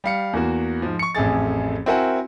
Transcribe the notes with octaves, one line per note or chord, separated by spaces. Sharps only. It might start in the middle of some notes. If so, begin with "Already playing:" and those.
G3 F5 C#7
E2 A#3 F#4
G#2 F3
C#6 C#7
A1 F2 A3 G#4 A6
C4 E4 F#4 A#4 F#5 G#5